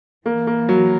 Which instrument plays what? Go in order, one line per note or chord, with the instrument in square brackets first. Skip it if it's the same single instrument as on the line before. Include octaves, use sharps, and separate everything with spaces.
[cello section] E3 [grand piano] A#3
[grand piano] A#3
F#3